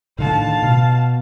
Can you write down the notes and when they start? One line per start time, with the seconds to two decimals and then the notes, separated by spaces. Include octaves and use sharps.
0.19 A2 D3 D#3 F5 A5
0.62 B2